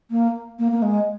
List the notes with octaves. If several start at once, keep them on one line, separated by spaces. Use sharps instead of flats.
A#3
A#3
A#3
G#3